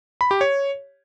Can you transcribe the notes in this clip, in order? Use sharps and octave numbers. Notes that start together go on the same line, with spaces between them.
B5
G4
C#5